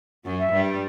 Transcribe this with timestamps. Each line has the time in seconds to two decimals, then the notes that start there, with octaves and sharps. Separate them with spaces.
0.24 F#2 F#3
0.39 E5
0.53 G2 G3